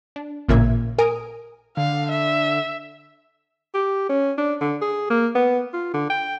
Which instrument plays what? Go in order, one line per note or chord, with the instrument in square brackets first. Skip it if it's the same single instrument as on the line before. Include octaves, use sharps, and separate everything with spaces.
[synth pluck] D4
A1 A#2 C#3 A#3 E5 G#6
A#4 G#5 D#6 D7
[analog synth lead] D3 [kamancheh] F5
[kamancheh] E5
[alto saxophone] G4
C#4
D4
D3
G#4
A#3
B3
F4
D3
G5